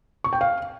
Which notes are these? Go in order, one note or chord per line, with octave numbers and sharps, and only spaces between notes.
C#6
G5
F5